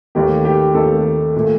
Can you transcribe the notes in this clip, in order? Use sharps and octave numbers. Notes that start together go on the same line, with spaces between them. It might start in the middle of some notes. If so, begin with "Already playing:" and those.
D#2 D#3 A3 G4
G4
D#2 D#3 A3 A4
A#2 A3